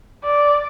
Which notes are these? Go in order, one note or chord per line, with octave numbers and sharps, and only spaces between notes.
D5